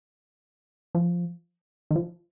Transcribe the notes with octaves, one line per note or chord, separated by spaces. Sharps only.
F3
D#3
F3